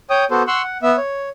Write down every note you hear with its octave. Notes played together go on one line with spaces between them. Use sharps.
C#5 G5 D#6
B3 F#4 A4 C5
F#5 C6 C#6 E6 F#6
F#5
B3 E5
C#5